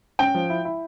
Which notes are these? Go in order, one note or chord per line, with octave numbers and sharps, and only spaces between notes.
C#4 G5
F3
E4
E4